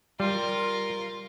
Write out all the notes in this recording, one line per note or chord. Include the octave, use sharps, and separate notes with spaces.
G3 F4 A#4